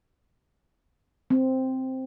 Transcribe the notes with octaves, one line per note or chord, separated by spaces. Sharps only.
C4